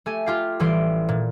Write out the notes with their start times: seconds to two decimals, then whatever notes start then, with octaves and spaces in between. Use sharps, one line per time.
0.06 A3 G4 G#5
0.26 F4 G4 F5
0.60 A1 E3 G3 C6 D7
1.09 A#2